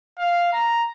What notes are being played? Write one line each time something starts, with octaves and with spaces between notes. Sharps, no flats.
F5
A#5